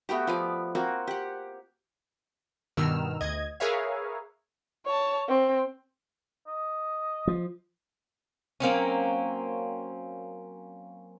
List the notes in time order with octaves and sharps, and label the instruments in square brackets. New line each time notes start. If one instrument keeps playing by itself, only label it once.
[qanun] A3 B3 F#4 G4
F3 B3 D5
A#3 C4 F#4
G4 F#5
[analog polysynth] G2 B2 D#3 E6 F6
D2 D#5 G#6
G#4 A#4 B4 C#5 E5 F5
[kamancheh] C#5 A5
C4
[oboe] D#5
[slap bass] F3
[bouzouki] F#3 A#3 C4 C#4